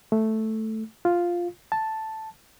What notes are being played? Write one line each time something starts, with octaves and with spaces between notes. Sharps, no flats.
A3
F4
A5